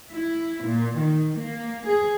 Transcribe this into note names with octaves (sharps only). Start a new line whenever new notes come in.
E4
A#2
D#3
A#3
G#4